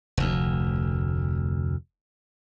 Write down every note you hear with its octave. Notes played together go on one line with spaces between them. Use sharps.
F1 D2